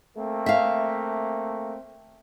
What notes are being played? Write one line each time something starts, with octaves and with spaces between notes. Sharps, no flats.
A3 A#3 C4
E5 F5